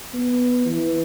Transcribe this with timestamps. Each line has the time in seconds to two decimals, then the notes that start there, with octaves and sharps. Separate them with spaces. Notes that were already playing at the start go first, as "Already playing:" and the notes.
0.13 B3
0.65 E3